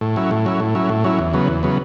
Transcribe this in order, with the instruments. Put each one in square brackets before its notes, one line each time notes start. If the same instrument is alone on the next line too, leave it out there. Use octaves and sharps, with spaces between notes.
[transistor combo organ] A2
F#3 C#4 E4
A2
F#3 C#4 E4
A2
F#3 C#4 E4
A2
F#3 C#4 E4
E2
C#3 F#3 B3
E2
C#3 F#3 B3